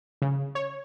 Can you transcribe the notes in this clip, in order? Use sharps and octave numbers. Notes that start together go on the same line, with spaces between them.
C#3
C#5